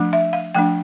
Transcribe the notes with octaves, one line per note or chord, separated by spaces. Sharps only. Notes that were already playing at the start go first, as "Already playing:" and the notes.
Already playing: F3 A3 D4
E5
F5
F3 A3 D4 G5